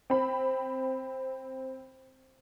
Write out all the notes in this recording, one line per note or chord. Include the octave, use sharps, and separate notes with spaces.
C4 B5